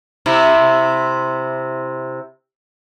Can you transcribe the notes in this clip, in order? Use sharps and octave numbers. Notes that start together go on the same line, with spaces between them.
C3 E4